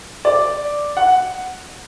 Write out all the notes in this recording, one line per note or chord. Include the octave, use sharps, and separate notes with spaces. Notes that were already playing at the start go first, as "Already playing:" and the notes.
D5
F#5